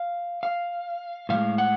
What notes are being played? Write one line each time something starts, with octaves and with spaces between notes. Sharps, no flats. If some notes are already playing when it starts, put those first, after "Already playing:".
Already playing: F5
F5
A2 F3 G#3 F5
F#5